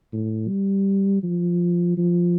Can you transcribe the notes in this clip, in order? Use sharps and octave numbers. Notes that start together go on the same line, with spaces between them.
A2
G3
F3
F3